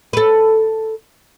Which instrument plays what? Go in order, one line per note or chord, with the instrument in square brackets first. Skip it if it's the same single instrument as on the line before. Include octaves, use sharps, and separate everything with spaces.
[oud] A4 B4